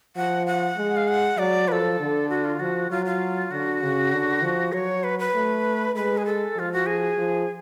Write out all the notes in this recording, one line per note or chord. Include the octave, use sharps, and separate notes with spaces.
F3 F#5
F#5
G#3
F5
F#5
F#3 D5
F3 A4 B4
D3
F#4
F4
F3 F#4
F#3 F4
F4
D3 F#4
C#3
D3
F3
F#3 C#5
B4
B4
A3
G#3 B4
G#4
A4
F3 F4
F#4
G#4
F3